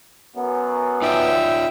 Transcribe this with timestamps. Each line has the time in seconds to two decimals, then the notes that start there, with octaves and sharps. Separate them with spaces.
0.36 F#2 B3
1.02 D#4 F4 D5 E5 G5